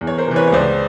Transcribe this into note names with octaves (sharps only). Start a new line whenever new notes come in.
E2
C#5
A#4 C5
C3 E3
B4 C#5
C#5
C#2 C5 D5